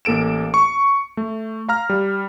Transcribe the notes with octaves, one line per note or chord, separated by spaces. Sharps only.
A1 A#3 A4 D7 E7
C#6
A3
F5 A#5 F6
G3